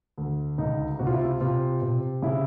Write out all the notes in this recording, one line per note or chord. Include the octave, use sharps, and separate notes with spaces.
D2
C#2 D#4
C3 F#4
F4
E4
F4
C3 F4
C3
C#3 E4